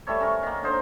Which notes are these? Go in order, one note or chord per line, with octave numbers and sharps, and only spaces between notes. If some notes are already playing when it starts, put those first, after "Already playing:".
G3 A3 A4 C#5
C#4 A#4 C#6
D#3 A#3
D3 D#4 C5